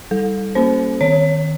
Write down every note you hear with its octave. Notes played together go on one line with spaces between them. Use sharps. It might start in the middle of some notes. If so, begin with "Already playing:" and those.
G3 A4
A#3 C#4 C5
D#3 C#5